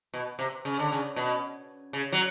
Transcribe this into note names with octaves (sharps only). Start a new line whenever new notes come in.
B2
C3
C#3
D3
C#3
B2
C#3
F#3